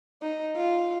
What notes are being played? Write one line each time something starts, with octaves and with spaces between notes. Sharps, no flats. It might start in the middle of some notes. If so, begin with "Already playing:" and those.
D#4
F4